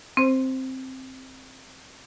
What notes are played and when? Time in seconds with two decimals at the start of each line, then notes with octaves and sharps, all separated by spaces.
0.17 C4 C5